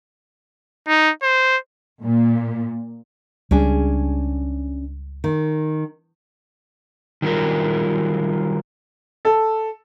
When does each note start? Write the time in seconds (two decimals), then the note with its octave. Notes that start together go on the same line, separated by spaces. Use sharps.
0.88 D#4
1.23 C5
2.04 A#2
3.51 C#2 G3 C#4 D4 G#4
5.24 D#3
7.22 D#3 F#3 G3 F4 A#4
9.25 A4